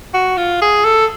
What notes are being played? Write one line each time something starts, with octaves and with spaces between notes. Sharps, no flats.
F#4
F4
G#4
A4